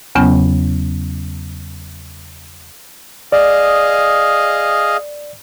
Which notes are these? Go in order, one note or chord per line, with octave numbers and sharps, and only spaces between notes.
E2 C#3 F#3 B3 C#4 G5
G#4 D5 D#5 F5